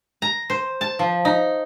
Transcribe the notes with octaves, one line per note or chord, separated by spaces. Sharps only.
A#5
C5
A5
F3
D#4